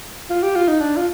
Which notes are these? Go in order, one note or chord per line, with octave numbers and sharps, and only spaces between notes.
F4
G4
F4
D#4
D4
F4